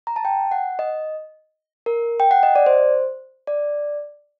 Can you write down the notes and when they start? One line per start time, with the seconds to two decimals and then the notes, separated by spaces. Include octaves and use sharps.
0.07 A#5
0.16 A5
0.25 G5
0.52 F#5
0.79 D#5
1.86 A#4
2.20 G5
2.31 F#5
2.43 D#5
2.55 D5
2.66 C5
3.47 D5